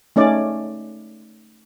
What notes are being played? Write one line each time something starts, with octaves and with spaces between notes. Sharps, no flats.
A3 C#4 D#4 D5